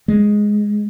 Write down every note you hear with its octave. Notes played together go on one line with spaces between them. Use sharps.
G#3